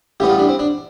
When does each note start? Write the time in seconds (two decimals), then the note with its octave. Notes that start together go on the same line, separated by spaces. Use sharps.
0.20 A1 A2 G3 B3 G4
0.29 F4
0.39 D4
0.49 C4
0.59 D4